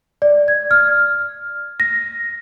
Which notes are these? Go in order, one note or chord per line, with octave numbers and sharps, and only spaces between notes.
D5
G#6
F6
A#6